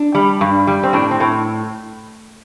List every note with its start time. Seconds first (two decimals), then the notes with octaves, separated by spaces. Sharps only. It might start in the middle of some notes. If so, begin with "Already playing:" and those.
Already playing: D4
0.15 G3
0.41 G2
0.67 G3
0.83 C4
0.93 A2 D4
1.11 C4
1.20 A2